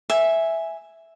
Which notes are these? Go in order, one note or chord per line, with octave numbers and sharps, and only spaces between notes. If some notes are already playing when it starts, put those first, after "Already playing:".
E5 G#5